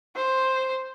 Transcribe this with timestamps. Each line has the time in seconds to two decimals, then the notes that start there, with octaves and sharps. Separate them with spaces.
0.16 C5